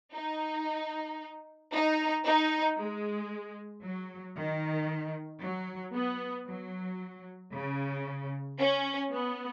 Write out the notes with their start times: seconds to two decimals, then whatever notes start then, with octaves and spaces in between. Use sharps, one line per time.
0.14 D#4
1.72 D#4
2.25 D#4
2.78 G#3
3.84 F#3
4.36 D#3
5.42 F#3
5.95 B3
6.48 F#3
7.53 C#3
8.59 C#4
9.12 B3